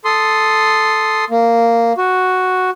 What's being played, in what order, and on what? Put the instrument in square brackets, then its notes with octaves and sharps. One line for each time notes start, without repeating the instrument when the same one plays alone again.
[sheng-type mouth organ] A4 C6 D#6
A#3
F#4